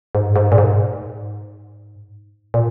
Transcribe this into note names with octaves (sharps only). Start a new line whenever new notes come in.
G#2
G#2
A#2
G#2
A#2